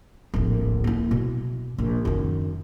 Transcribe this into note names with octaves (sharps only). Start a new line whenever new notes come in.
D1 A#1
A#3 E4
B2
A#1
F#2 D#3